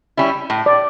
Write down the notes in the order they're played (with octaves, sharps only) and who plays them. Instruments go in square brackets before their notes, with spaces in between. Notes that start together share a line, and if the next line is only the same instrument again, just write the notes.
[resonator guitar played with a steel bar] G3 C#4 E4
A2
[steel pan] D5